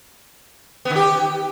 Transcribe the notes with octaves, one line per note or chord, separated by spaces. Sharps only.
B3
D#3
G4